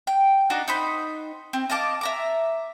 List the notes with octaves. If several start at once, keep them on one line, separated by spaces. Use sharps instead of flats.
G5
D4 D#4 F#4
D#4 C5 B5
C4
D#5 F5 A5 D6
E5 A#5 D6